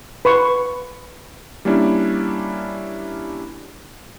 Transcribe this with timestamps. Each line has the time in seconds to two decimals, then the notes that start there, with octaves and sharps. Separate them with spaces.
0.25 B4 C6 C#6
1.65 G3 A#3 C#4 D4 E4